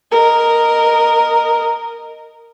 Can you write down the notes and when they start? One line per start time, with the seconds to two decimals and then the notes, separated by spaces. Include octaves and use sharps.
0.12 A#4 D#5